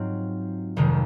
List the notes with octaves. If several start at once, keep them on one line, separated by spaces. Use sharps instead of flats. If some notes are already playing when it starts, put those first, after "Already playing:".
Already playing: G#2 F#3 C4 F4
F1 F2 C3 D#3 G#3